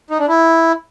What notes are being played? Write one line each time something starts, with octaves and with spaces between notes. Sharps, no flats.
D#4
D4
E4